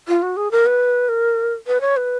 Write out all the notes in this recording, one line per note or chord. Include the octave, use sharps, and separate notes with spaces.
F4
F#4
G#4
A#4
B4
A#4
B4
C#5
B4